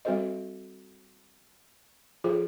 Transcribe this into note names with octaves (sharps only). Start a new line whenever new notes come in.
G3 C4 F#4 A4 C5 D#5
F3 F4 G#4 A4 C5